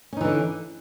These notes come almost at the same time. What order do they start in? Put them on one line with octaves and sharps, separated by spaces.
C#4 D#4 E3 D3